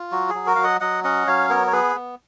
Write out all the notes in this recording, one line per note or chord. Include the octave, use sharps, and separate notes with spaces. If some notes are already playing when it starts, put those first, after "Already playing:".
Already playing: F4
F#3 F#4
G#4
F#3
F#4 A#4
F#3 F5
D#5 F#5
F#3 D#5 F#5
C#4 D#5 F#5
F#3 C#5 F5
B3 A#4 C#5
C#5
B3 G#4 B4
B3